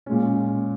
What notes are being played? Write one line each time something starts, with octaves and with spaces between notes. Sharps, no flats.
A#2 G#3 C#4